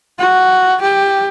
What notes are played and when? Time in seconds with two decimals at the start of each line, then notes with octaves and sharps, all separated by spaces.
0.19 F#4
0.81 G4